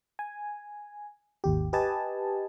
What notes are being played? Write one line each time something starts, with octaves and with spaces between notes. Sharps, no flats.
G#5
G#1 D#2 G4
G4 B4 D#5 G#5 A5